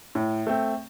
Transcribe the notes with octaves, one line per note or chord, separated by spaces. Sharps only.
A2
A3 C4